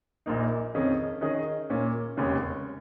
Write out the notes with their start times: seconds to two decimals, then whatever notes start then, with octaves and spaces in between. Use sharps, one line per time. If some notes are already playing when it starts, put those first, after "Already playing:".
0.26 A#1 A#2 A#3 D#4
0.74 F2 D#3 C#4 G#4 D#5
1.21 D#3 C#4 G#4 D#5
1.70 A#2 A#3 C#4
2.17 F1 D#2 C#3 G#3 C#4